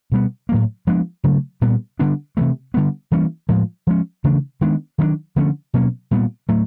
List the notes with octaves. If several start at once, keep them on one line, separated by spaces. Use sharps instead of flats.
B2 G3 B3
A2 F#3 A#3
F3 G#3 B3 D4
C#3 F#3 A3
A#2 G3 B3
D3 G3 B3 D4
C3 E3 A3
D3 G3 B3
E3 G3 A#3 C#4
A2 F3 G#3
F3 G#3 C#4
C#3 E3 A3 D4
D#3 G#3 B3 D4
D#3 F#3 A3 D4
D3 F3 A3 C#4
B2 F#3 A#3 C#4
A#2 G3 B3
A2 F#3 A3